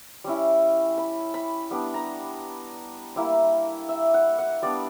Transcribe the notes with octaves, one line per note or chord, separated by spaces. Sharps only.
G3 C#4 E4
B5
B5
G3 B3 D4
A#5
G3 A#3 E4
E5
F#5
F#5
G3 B3 D4 D5